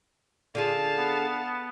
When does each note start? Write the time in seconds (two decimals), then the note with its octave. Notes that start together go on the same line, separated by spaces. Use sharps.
0.55 D3 F4 G#4 F5 A5
0.97 B3